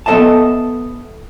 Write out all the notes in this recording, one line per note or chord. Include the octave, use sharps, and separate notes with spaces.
B3 A4 B4 D#5 E5 A5